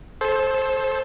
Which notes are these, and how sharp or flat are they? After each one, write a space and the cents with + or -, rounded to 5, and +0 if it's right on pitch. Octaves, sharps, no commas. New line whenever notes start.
A4 -25 C5 +15